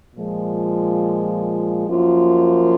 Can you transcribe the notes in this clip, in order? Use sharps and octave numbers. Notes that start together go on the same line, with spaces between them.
A#2 F3 G#3
F#2 F3 A#3 F4